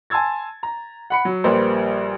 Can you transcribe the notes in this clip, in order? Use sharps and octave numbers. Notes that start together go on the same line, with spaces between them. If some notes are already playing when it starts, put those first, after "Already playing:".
G#5 A5 C6 E6 G#6 A6
A#5
F#5 B5 C#7
F#3
A#1 G3 A#3 B4 C5